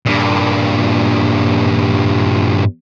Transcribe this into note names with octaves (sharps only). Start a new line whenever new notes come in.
G2 A#2